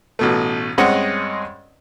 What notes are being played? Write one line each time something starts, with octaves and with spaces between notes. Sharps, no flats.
A1 B2 A3
G2 G#3 C4 C#4 D#5 F#5